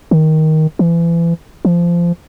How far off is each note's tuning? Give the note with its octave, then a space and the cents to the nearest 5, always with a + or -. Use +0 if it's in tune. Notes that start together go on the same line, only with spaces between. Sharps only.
D#3 +10
E3 +35
F3 -20